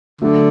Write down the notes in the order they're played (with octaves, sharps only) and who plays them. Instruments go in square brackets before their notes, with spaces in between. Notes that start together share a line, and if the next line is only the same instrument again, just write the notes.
[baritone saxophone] D3 [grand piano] F#3 A3 D4 F#4 A4